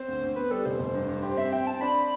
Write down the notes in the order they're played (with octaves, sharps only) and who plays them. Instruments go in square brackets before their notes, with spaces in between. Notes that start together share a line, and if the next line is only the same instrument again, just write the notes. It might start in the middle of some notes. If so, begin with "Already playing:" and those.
Already playing: [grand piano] C4 [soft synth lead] C5
[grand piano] D2
D2
[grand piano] B3 [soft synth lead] B4
[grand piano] G3 [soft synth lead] A4
[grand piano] F1 [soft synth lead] C5
[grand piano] F1
G2
G2
[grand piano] G4 [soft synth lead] C5
[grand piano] C4 [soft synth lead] E5
[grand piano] C4 [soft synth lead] G5
[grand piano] C4 [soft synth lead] A5
[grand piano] D4 [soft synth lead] B5